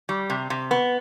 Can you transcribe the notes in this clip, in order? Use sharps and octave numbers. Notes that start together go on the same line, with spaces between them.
G3
C3
C3
B3